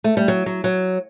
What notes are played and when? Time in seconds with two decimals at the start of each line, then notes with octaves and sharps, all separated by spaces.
0.04 A3
0.17 G3
0.28 F#3
0.46 F#3
0.64 F#3